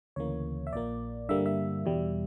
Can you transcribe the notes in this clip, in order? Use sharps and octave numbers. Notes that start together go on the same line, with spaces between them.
D2 C#3 E3 A#3 C#5
E5
A#1 A#2 A#3 D5
G2 D3 G3 A#3 E5
E5
E2 B2 G3